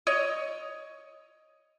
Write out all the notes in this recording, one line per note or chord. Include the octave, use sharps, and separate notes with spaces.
C#5 D#5